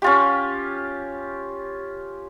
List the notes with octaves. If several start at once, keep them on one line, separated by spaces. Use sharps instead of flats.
C#4 F4 G4